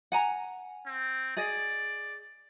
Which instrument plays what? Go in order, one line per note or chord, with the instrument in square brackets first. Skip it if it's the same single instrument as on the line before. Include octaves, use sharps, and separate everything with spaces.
[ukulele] F#5 G#5 A#5
[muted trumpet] C4
[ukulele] G#4 D#5 [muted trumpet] D5